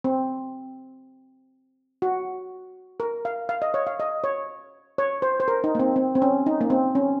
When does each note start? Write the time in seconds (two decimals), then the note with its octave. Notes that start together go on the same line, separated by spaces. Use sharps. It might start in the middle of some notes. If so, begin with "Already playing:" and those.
0.04 C4
2.02 F#4
3.00 A#4
3.25 F5
3.49 F5
3.62 D#5
3.74 C#5
3.87 F5
4.00 D#5
4.24 C#5
4.98 C#5
5.22 C5
5.40 C5
5.48 A#4
5.64 D#4
5.75 A#3
5.79 C4
5.96 C4
6.15 C4
6.22 C#4
6.46 D#4
6.61 A#3
6.70 C4
6.95 C#4